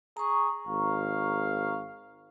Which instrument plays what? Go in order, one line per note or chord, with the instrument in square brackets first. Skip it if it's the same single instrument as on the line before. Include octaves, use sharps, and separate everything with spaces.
[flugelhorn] G#4 [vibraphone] A#5 C#6
[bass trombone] G#1 [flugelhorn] F5